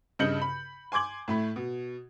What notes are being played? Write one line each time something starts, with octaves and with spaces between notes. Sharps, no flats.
G2 C#3 D#5 G6 C#7 F#7
B5
G#5 C6 D6 G#6 F#7
A2 A3 B5
B2